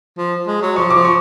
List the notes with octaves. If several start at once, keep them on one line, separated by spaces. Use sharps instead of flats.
F3
G#3
F#3
F3 C#6
D6
F3
C#6